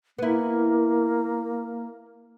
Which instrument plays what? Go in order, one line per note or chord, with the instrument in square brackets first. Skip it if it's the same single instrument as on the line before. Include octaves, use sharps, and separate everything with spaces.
[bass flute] A#3 [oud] B3 E4